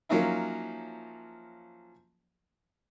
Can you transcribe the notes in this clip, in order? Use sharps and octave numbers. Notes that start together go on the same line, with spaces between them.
F3 F#3 A#3 C#4 D#4 E4